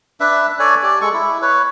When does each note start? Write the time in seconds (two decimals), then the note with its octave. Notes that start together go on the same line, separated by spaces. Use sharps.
0.20 D4 B4 E5
0.59 A4 C#5 D5 G#5
0.83 G4 D5
1.01 G#3 A4 C#6
1.14 E4
1.42 B4 C#5